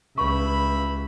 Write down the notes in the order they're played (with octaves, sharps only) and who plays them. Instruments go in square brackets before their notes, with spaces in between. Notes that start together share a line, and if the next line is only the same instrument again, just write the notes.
[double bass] C#2 [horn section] G2 E5 B5 [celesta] C#6